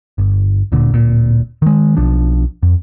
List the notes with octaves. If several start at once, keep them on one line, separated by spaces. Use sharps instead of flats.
G1
D1 A#2 D3
D1 A#2
D#3 G#3
B1 F3 D4
F2